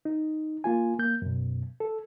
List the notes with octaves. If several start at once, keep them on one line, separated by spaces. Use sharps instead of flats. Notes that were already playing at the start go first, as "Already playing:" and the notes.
D#4
A#3 F4 G#5
A#3 G6
F#2 B2
A4